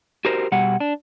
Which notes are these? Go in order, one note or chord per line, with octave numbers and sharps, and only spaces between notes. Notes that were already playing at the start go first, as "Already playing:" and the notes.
F#4 G4 A#4 C5
B2 G3 F#5
D4